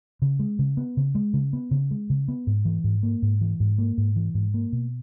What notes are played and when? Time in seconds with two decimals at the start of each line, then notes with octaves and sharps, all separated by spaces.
0.22 C#3
0.39 G#3
0.59 C#3
0.77 B3
0.97 C#3
1.15 G#3
1.34 C#3
1.53 B3
1.71 C#3
1.91 G#3
2.10 C#3
2.28 B3
2.47 G#2
2.65 E3
2.84 G#2
3.03 A#3
3.22 G#2
3.41 E3
3.60 G#2
3.78 A#3
3.98 G#2
4.16 E3
4.34 G#2
4.54 A#3
4.72 B2